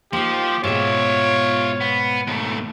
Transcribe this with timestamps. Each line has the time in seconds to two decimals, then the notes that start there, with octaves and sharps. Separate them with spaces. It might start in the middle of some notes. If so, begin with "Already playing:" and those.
0.13 F3 A#3 D#4 G4
0.64 G#2 B2 F4 C#5 E5
1.81 B3
2.27 D#2 A3